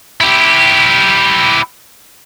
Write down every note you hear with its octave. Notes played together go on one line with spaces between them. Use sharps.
E4 G4